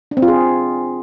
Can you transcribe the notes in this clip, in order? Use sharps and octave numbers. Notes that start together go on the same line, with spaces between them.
D4
C4
F4
G#4